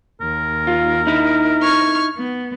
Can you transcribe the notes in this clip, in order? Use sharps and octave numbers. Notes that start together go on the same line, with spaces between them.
D#2 A#4
F4
D#4 E4
C#6 F6 G#6
B3